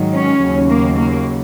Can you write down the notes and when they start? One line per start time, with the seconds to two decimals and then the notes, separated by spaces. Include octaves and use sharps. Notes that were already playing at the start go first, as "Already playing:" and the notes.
Already playing: G#2 D#3 F#3
0.14 C#4
0.41 D#2 C#3 F#3
0.70 A#3
0.98 A#3